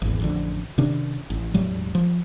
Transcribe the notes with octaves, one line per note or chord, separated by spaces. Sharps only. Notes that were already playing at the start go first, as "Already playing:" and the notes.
G#1 E2
A1 F2 D3
C3 D#3 C#4 D4
A1
E1 A2 F#3 G3
F3